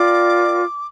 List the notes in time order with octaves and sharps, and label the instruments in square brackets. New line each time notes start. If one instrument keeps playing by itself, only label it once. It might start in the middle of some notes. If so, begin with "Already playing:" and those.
Already playing: [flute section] F4 A#4 D5 G5 [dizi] D6